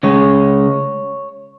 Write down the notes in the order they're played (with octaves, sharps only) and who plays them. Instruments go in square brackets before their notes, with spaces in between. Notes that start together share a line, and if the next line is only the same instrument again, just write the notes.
[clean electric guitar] C#3 G#3 C#4 C#5